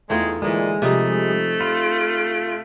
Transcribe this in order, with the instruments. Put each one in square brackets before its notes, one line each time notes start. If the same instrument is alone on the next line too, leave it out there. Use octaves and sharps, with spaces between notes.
[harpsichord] E2 G5 G#5 [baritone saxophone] G#3 [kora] A3 D#4 F4
[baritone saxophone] A#2 [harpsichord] D3 E3 [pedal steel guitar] G#3
[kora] C3 D#4 [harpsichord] F3 G3 [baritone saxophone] A3
[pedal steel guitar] F4 [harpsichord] B5